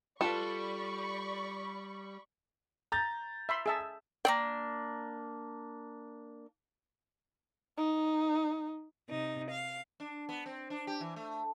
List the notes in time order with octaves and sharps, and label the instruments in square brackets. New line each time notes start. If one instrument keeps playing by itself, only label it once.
[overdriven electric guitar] G3 [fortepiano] F4 B4 [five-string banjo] A4 [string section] D5 B5 C#6
[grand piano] A#5 G6 A6
[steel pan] E5 B5 C6
G#4 E5 A5
[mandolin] A#3 C4 D4 [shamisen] G5
[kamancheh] D#4
[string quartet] C3 D#4
F5
[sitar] D4
B3
C4
D4
G4
E3
A3